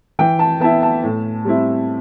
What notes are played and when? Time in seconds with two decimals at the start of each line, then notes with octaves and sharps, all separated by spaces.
0.19 E3 G5
0.39 A5
0.60 B3 E4 A5
0.83 A5
1.03 A2
1.45 G3 C4 E4